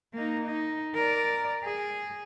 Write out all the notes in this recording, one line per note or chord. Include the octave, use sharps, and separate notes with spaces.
A#3 D#4
D#4
A#4 D5
G#4